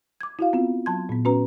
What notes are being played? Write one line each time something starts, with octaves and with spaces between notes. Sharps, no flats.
D6 G#6
E4 F#4 F5
B3 C4 F4
F#3 A5 C6 G#6
A#2 B3
C#4 F#4 B4 A#5